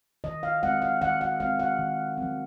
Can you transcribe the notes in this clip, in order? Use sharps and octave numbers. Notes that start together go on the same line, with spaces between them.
D#3 D#5
F5
G#3 C4 F#5
F5
D#3 F#5
F#5
G#3 C4 F5
F#5
D#3
F#3 C4